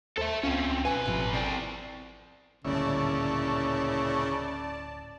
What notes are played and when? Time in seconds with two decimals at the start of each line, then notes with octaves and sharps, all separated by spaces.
0.18 D#2 A4 C5 E5
0.43 C#2 C4 C#4 F4
0.85 B1 B4 G#5
1.05 G#1 A2 C3 F3
1.34 C4 A4 D5
2.64 D1 G1 A#2 C#3 C#4 E4 D5 A5